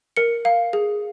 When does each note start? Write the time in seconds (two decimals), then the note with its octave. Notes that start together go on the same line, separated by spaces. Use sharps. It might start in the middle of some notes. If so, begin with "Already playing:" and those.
0.17 A#4 C#7
0.45 F5
0.73 G#4